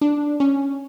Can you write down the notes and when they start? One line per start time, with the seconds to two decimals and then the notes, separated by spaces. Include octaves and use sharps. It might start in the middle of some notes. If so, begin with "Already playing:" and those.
0.01 D4
0.40 C#4